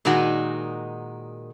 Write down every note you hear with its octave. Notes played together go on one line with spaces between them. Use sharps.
A#2 D#3 G#3 D#4 F#4